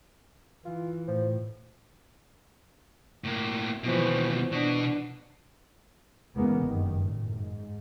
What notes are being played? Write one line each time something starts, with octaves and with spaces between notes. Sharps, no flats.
E3 F4
A2 F3
A2 A#3
D#2 B2 E3 F3
B2 B3 D4
E2 C#3 E3 G#3 A#3 B3
F#1 G2 D#3
F#2 A2
G#2